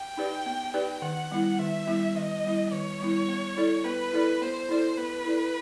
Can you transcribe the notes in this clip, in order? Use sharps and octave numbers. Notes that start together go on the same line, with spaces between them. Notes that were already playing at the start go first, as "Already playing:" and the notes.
Already playing: G5
D#4 G4 B4 D5
B3
D#4 G4 B4 D5
D#3 F#5
G3 B3 E4
D#3 E5
G3 B3 E4
D#3 D#5
G3 B3 E4
D#3 C#5
G3 B3 E4
B3
E4 A4 D5
B3 B4
E4 A4 D5
B3 C5
E4 A4 D5
B3 B4
E4 A4 D5